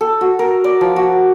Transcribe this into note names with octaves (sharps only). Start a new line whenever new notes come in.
A4
F#4
A#4
D5
F3
F#4